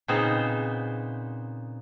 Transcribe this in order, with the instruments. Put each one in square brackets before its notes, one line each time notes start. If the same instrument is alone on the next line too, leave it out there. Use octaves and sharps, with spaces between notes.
[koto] A#2 C#3 B3 C4 D#4 C5